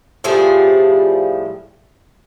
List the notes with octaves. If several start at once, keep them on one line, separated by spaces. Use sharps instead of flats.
A2 F3 G3 G#4